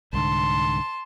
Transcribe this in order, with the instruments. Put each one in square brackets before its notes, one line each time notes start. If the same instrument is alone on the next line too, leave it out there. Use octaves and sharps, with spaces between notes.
[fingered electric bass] C2 G#2 D3 [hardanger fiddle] A5 C6